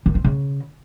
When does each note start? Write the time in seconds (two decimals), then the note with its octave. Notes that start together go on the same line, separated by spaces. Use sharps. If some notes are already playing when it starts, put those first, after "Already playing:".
0.06 D#3
0.15 C4
0.24 C#3